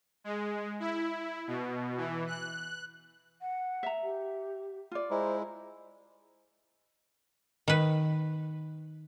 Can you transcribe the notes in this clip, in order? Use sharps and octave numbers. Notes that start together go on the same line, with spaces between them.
G#3
E4
B2
E3
F#6
F#5
E5 A#5
G4
F4 D5
G#3 E4 C5 A#5
D#3 B4